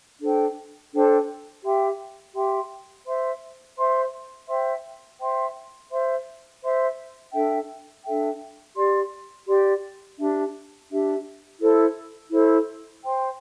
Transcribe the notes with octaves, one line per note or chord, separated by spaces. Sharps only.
D4 A4 C5 G5
D4 A4 C5 G5
G4 E5 G5 C6
G4 E5 G5 C6
C5 E5 C6
C5 E5 C6
C5 E5 G5 C6
C5 E5 G5 C6
C5 E5 C6
C5 E5 C6
D4 A4 E5 G5
D4 A4 E5 G5
G4 D5 C6
G4 D5 C6
D4 G4 E5
D4 G4 E5
E4 A4 C5
E4 A4 C5
C5 G5 C6